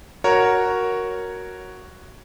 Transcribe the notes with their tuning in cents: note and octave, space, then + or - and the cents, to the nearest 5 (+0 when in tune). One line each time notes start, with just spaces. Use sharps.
F#4 +0 A#4 +0 C#5 +0